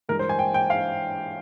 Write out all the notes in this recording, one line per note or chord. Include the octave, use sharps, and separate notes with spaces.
G2 E3 G#3 A#4
C5
G#5
G5
G5
F5